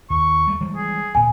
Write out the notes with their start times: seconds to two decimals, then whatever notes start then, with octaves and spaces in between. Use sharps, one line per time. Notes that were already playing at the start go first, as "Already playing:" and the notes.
0.10 D#2 C#6
0.47 G3 A3
0.60 E3 G3 G#3
0.76 G#4
1.15 D2 A#2 G#5